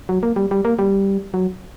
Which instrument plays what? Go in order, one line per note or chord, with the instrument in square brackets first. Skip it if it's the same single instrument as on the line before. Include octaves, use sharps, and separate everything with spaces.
[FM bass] F#3
A#3
G3
G3
A#3
G3
F#3